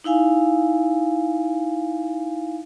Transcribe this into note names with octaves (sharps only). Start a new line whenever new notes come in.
D#4 E4 F5 G#5